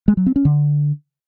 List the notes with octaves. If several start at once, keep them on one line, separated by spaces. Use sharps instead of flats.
G#3
F#3
C4
C#4
D3